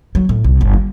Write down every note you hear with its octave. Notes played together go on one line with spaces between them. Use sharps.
F#3
A2
C2
G1
G3